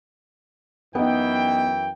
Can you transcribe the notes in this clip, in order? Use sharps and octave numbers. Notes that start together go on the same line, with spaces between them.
F#2 E3 B3 D#4 G5